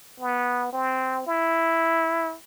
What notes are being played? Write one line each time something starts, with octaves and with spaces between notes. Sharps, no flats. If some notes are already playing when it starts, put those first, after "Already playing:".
B3
C4
E4